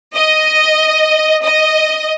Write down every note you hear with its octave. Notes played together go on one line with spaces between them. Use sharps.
D#5
D#5